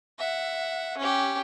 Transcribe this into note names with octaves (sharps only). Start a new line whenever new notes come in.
E5 F#5
C#4 G4